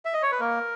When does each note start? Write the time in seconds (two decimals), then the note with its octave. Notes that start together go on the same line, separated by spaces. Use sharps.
0.05 E5
0.14 D#5
0.23 C#5
0.32 B4
0.40 A#3 A#4